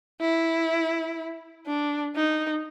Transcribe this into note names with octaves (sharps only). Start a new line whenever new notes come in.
E4
D4
D#4